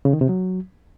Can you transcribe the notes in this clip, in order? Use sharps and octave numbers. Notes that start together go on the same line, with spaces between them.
C#3
D#3
C3
F#3